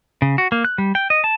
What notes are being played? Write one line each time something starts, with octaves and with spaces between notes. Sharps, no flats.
C#3
F#4
A#3
F#6
G3
G5
D#5
A5